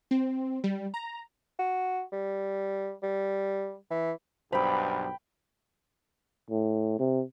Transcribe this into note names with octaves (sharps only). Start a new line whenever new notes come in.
C4
G3
A#5
F#4
G3
G3
E3
B1 G2 C5 G5 B5
A2
C3